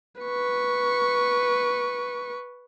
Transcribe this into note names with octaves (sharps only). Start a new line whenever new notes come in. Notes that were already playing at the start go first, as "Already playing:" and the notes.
B4 C#6